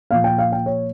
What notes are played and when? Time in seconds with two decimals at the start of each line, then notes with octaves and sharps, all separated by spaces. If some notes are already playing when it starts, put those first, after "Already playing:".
0.10 A#2 F3 F5
0.24 G5
0.38 F5
0.52 G5
0.66 C#5